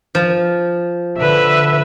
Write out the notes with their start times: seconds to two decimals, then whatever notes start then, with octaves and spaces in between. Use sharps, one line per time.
0.15 F3
1.18 D3 B4 E5